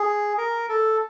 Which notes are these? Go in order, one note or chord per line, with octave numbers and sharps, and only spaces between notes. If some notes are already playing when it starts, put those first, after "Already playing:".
Already playing: G#4
A#4
A4